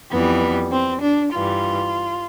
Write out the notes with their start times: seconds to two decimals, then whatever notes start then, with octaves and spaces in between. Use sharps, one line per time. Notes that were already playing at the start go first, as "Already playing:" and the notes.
0.12 F2 E3 G3 B3
0.72 C4
1.01 D4
1.32 G2 E3 G3 F4